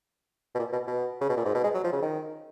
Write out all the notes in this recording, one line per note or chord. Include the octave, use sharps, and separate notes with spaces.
B2
A#2
B2
B2
C#3
B2
A#2
G#2
B2
G#3
F#3
F3
C#3
D#3